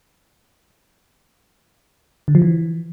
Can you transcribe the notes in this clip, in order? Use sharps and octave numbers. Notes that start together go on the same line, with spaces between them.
D3
F3
E3